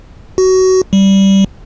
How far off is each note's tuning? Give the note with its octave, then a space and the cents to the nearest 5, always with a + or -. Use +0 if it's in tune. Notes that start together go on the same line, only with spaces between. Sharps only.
F#4 +20
G3 -10